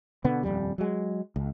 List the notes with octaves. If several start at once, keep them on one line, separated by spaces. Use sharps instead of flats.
B2 D3 B3
D#1 G#1 F2 G3
F#3 G#3
C#2